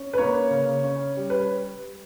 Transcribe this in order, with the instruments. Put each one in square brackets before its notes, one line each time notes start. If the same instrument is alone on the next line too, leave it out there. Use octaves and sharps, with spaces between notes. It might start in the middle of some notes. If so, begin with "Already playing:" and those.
Already playing: [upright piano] C#4
B4
A#3 C#5
C#3
C#4
G3
B4